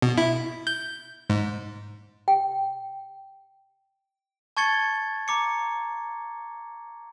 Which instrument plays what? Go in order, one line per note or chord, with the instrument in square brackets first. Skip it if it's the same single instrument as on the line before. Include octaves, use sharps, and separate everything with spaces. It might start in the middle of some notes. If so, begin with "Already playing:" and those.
[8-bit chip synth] B2
E4
G6
G#2
[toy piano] G5
[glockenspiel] A5 C#6 G#6 A6 C#7 G7
A#5 D6 C#7